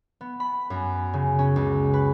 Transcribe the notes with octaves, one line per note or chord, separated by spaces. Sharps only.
B3
B5
F#2
C#3
C#4
C#2
B4